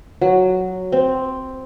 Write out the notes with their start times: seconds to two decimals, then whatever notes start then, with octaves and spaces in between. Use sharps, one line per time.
0.21 F#3
0.92 C4